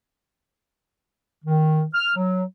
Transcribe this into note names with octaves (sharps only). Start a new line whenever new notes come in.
D#3
F6
F#3